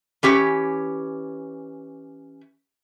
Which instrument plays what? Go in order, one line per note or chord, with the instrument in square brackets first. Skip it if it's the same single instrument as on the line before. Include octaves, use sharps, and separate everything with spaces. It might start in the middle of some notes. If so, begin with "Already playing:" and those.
[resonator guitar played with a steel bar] E3 C#4 G4